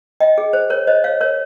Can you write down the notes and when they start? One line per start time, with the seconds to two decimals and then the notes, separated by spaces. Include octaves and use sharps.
0.20 D#5 G5
0.38 G#4
0.53 C5
0.70 A#4 C#5
0.87 C5 D#5
1.04 C#5 F5
1.21 A#4 C#5